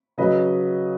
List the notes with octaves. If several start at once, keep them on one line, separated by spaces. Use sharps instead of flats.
C#3 F#3 B4 D#5